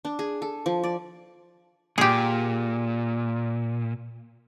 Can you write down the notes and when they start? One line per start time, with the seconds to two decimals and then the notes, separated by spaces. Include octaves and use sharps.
0.05 D4
0.19 G#4
0.42 A4
0.66 F3
0.84 D5
1.98 A#2 G4 G#4